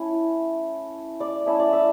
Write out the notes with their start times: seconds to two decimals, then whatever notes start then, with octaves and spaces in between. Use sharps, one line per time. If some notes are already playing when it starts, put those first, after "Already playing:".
Already playing: A3 C#4 E4
1.20 D5
1.46 A3 C#4 E4 E5
1.59 D5
1.73 E5